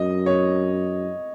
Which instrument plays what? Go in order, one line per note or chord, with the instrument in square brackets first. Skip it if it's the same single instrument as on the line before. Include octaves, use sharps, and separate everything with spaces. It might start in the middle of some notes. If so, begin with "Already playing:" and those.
Already playing: [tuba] F#2 [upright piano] D#5
[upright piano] C#5